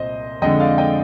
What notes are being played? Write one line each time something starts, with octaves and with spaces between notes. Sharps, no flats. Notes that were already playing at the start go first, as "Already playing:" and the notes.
Already playing: C2 A#2 C5 D#5
F2 D3 G#3 D#5 G5
D5 F5
D#5 G5